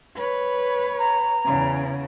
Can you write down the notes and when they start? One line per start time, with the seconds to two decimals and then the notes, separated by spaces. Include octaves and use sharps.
0.15 B4 C#5
0.99 A#5
1.45 E2 C#3